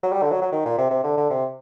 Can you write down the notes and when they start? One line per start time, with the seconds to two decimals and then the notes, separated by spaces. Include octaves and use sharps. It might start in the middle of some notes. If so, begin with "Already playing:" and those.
0.03 F#3
0.12 G3
0.22 D3
0.31 F#3
0.41 F#3
0.52 D#3
0.65 A#2
0.78 C3
0.90 C3
1.04 D3
1.17 D3
1.30 C3